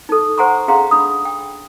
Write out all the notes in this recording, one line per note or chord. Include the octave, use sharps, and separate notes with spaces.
D#4 A4
C5 F#5 G#5 A#5 C6 C#6
C#4 G#4 F5 F#5 A#5 C6
D4 B5 D#6
G5